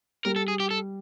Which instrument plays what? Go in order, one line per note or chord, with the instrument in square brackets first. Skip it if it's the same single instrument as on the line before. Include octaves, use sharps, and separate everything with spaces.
[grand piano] G3 [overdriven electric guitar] A#4
[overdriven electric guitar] A4
G#4
G4
A4